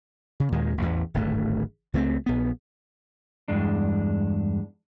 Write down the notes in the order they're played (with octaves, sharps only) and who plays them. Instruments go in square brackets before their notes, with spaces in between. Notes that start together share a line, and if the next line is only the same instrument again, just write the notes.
[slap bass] C#3
D#2 A#2 D#3 G#3
A1 E2
D1 G#1 G2 A3
C#2 A3 B3 C4
A#1 B3
[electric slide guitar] E2 G2 G#3 D4